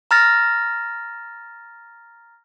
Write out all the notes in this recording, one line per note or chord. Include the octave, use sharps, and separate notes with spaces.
A#5 F6 A6 A#6